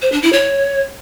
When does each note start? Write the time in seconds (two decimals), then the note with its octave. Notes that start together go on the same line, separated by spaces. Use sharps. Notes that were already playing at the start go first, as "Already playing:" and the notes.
0.02 C5
0.12 D4
0.22 E4
0.33 C#5